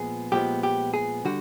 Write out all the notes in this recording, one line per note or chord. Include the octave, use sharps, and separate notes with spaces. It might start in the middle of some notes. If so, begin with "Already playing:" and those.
Already playing: A#2 F3 G#3 B3 G#4
A#2 F3 G#3 B3 G4
G4
G#4
D3 G3 F#4